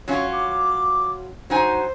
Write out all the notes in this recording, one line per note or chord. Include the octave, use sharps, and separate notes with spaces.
F#3 C#4 F4 C#5
D6
F#3 D#4 C5 G#5